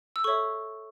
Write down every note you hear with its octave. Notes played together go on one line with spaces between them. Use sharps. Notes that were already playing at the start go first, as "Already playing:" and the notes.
E6
A4 C#5 E5 C#6